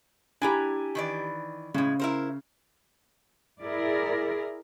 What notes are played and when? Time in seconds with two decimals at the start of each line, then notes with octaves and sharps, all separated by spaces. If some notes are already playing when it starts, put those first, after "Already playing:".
0.42 D4 E4 G4 G#5 A#5
0.95 D#3 E3 D5
1.74 A2 C#3 G#3
2.00 E4 A#4 C5
3.61 E4 G#4 A#4 D5